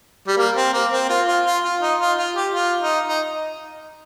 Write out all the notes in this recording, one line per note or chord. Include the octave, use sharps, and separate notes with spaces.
G3
A#3
C4
A#3
C4
F4
F4
F4
F4
D#4
F4
F4
G4
F4
D#4
D#4